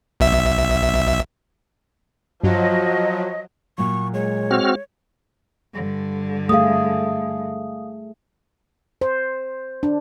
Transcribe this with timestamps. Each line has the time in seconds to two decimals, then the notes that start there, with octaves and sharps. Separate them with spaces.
0.20 B1 E5
2.43 G2 F3 F#3 D#5
3.78 A#2 F#3 C#6
4.14 G#3 C#5
4.51 C4 F#4 F6
5.74 G2 D3
6.49 A3 G#4 F5 D#6
9.01 C5
9.83 D4